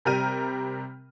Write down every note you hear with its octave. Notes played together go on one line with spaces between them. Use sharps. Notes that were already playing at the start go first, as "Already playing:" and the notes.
C3 G3 A#4 G5 F6 D#7